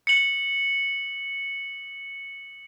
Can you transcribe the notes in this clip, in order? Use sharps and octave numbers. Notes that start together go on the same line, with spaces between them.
C#7 F#7